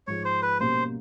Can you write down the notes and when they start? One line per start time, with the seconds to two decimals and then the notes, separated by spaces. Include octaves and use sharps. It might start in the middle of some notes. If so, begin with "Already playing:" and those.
0.07 G#2 F3 G#3 C#5
0.25 C5
0.42 B4
0.60 B2 G3 A#3 C#4 C5